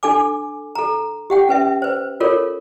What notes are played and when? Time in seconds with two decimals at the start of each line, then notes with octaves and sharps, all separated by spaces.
0.03 D4 A4 G#5 D6
0.75 A4 A#5
1.30 G4 F#5 G5
1.49 C#4 B4 E5
1.82 B4 C5
2.20 F4 A4 A#4 C#5